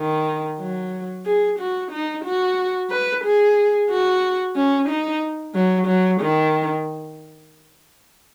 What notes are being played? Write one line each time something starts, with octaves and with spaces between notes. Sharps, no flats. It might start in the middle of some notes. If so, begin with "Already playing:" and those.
Already playing: D#3
F#3
G#4
F#4
D#4
F#4
B4
G#4
F#4
C#4
D#4
F#3
F#3
D#3